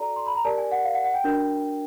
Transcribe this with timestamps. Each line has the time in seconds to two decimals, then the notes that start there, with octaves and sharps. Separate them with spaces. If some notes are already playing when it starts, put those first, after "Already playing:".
Already playing: F#4 A4 D5 A#5
0.16 C6
0.27 B5
0.35 A#5
0.45 G4 A#4 D5 A5
0.58 G#5
0.72 F#5
0.85 F5
0.94 F#5
1.04 F#5
1.14 G5
1.24 D4 F#4 A#4